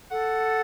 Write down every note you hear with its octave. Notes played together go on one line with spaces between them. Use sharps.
A4 F#5